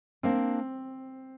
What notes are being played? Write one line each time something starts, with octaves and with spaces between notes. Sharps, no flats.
A#3 C4 D4 A#4 F5